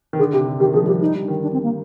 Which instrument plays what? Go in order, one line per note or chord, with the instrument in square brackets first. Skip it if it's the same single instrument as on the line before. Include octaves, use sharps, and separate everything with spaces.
[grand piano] D#3
[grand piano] D3 [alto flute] G#4
[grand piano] C3 [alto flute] G4
[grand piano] D3
[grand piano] D#3 [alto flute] G4
[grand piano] F3 [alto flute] G#4
[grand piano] G3
[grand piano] F3 [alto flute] G4
[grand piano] G3 [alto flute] D#4
[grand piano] G3
D3
D#3
[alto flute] D4
C4
A#3